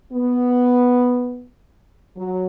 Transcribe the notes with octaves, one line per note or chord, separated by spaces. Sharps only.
B3
F#3